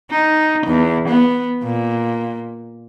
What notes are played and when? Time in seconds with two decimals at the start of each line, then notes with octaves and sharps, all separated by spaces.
0.11 D#4
0.67 E2
1.08 B3
1.63 A#2